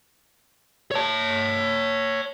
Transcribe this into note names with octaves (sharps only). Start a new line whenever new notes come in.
C#5 A5